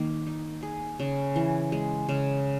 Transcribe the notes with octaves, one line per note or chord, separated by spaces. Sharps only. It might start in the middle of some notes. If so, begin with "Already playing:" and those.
Already playing: D#3 A#3
D#4
G#4
C#3
E3
G#3
C#3